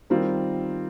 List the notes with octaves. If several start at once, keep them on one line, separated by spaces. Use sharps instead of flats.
D#3 G3 C4 F4 A#4